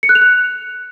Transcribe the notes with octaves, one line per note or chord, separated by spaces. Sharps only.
C#7
F#6
F7
F#6